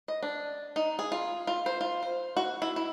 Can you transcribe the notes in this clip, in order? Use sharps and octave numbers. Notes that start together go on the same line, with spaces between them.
D#5
D4
D#4
G#4
F4
F4
C5
F4
C5
F#4
E4
E4